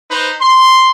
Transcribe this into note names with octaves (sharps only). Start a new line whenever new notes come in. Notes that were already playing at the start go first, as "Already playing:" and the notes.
D#4 B4 C5
C6